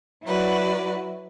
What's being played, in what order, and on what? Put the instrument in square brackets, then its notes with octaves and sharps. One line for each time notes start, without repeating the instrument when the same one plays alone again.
[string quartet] F#3 E4 F#4 B4 D5